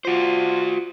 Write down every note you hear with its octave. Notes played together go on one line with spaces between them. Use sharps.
F4 F#4 C5